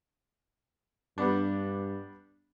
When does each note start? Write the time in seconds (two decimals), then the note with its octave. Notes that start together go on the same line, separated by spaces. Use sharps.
1.18 G2 G3 B3 D4